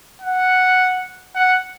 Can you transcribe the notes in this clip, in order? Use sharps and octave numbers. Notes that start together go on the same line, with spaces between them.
F#5
F#5